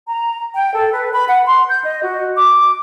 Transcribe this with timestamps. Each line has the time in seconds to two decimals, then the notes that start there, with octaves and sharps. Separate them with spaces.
0.08 A#5
0.55 G5
0.73 A4
0.92 B4
1.13 B5
1.27 F#5
1.45 C6
1.68 G6
1.84 D#5
2.03 F#4
2.36 D6